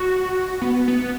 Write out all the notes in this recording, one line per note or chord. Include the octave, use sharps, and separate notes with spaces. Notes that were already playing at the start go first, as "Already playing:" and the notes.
Already playing: F#4
B3
B3